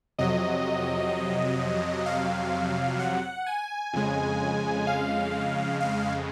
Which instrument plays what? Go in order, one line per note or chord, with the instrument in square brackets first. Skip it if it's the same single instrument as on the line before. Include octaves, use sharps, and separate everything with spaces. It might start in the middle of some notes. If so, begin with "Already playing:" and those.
[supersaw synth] F2 C3 F#3 D#5
F5
F#5
G#5
F2 C#3 G#3
F5
F5